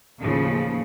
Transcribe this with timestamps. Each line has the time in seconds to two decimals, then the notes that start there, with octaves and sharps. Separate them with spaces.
0.19 A1 D#2 C#3 F3